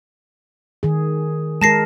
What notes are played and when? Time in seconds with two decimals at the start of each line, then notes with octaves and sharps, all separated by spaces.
0.83 D#3 G#4
1.61 G#3 A#4 A5 A#6 C7